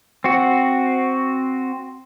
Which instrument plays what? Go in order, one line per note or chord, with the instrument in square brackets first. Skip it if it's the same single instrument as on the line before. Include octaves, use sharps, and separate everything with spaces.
[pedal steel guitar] C4 F#4